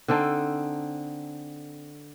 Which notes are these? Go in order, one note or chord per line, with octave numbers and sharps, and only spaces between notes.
D3 C4 D#4 A4